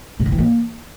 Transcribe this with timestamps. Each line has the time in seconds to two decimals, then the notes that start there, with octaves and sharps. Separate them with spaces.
0.20 C3
0.26 D3
0.32 E3
0.38 A#3